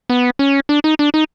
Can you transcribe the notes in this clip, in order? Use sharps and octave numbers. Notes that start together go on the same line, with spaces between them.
B3
C#4
D4
D#4
D4
D#4